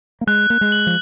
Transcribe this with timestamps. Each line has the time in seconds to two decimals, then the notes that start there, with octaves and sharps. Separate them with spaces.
0.21 A#3
0.27 G#3 F#6
0.50 A#3 F#6
0.61 G#3
0.72 F#7
0.87 F3